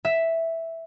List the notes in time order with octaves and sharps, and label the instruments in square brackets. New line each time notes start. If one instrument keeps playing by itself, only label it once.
[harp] E5